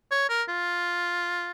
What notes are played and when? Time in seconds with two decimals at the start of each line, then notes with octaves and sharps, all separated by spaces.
0.11 C#5
0.30 A#4
0.49 F4